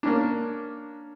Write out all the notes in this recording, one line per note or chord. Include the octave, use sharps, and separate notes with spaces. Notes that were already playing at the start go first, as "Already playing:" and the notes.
A#3 C#4 D4